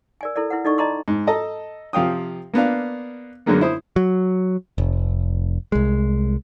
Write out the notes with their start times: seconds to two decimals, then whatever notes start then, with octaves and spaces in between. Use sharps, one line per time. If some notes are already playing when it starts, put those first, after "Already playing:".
0.21 A#4 D5 G#5
0.36 E4 A4 A#4 D5
0.50 E4 B4 F#5
0.65 D#4 A4 D5 D#5 C#6
0.78 D5 D#5 A5 A#5 C6 D6
1.08 G#2
1.27 A4 D#5 A5 A#5
1.93 C3 F3 F5 G5 D#6
2.54 A#3 B3 D4 F5
3.46 F#2 D3 F#3 G#3 A#3 B3
3.61 E4 C5 D#6
3.96 F#3
4.78 F1
5.72 C2 G#3